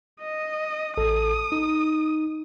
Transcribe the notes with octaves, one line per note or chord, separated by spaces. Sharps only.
D#5
A1 A4 D#6
D#4